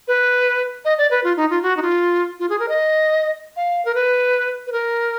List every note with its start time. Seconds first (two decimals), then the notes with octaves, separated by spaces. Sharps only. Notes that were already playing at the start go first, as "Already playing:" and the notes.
0.08 B4
0.85 D#5
0.98 D5
1.11 B4
1.24 F4
1.37 D#4
1.50 F4
1.62 F#4
1.77 D#4
1.82 F4
2.39 F4
2.49 G#4
2.59 A#4
2.68 D#5
3.56 F5
3.85 A#4
3.94 B4
4.67 B4
4.72 A#4